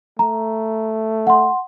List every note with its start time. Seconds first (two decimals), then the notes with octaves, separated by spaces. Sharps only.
0.19 A3 A#5
1.27 F#5 C6